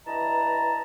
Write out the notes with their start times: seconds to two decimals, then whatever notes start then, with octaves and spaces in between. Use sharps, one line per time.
0.06 G2 E3 D#5 A5 A#5